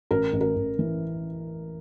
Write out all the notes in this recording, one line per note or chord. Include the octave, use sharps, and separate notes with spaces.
A1 A#4
A1
A#4
A1
E3